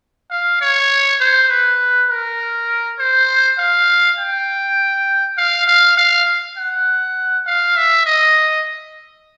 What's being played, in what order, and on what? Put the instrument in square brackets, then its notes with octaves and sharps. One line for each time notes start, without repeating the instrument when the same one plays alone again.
[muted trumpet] F5
C#5
C5
B4
A#4
C5
F5
G5
F5
F5
F5
F#5
F5
E5
D#5